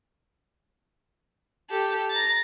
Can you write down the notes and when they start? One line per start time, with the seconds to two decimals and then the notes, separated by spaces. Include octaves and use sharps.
1.70 G4 A4
2.11 A#5 A6